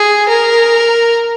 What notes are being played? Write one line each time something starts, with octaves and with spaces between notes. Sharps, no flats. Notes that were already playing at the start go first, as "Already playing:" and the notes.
Already playing: G#4
A#4